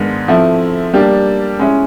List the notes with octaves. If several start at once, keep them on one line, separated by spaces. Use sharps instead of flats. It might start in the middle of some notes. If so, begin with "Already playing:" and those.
Already playing: G#2 D#3 G#3 B3 D4
F3 A3 C4 E4
G3 A#3 D4 G4
G#3 C#4 E4